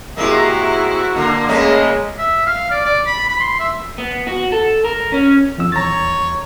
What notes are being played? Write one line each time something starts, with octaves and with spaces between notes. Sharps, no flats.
C3 G#3 A#3 E4 F#4
D3 A#3
C#3 G#3 A3 C#4
E5
F5
D5
D5
B5
B5
C6
E5
B3
F#4
A4
A#4
C#4
F2 E6
D#1 E2 C#5 A#5 A6